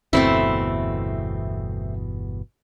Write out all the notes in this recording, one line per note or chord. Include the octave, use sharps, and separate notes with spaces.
G1 E2 B2 A3 C4 E4